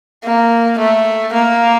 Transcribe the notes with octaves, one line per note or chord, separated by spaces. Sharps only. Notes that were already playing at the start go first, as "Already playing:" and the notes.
A#3
A3
A#3